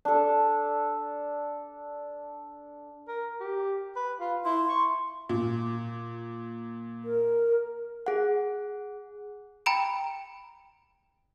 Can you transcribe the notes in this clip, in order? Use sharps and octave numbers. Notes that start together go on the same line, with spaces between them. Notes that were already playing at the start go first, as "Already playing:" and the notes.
D4 A4
A#4
G4
B4
F4
E4 C6
C#6
A#2
A#4
G#4 F#5
G5 A#5 B5 D7